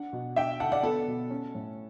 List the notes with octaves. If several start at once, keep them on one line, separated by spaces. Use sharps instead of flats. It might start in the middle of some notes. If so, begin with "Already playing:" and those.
Already playing: D4 F#5
B2
D4 E5 G5
D3 F#5 A5
D5 F#5
B3 A4
B2
C#4
A2